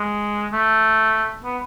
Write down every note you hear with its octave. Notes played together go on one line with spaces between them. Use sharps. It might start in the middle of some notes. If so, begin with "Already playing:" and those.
Already playing: G#3
A3
B3